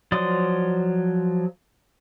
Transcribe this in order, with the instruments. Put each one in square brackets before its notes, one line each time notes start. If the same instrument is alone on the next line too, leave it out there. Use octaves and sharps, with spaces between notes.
[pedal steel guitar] F3 F#3 D5 C6 D#6